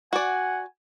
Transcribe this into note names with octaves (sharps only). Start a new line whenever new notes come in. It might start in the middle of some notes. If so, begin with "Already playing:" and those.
F#4 D5 F#5 G#5